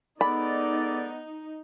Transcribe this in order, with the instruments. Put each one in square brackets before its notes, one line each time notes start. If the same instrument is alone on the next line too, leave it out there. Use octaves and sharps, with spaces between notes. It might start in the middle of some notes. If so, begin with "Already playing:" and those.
[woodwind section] G#3 A4 D5 [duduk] B3 [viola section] D#4 [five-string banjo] B5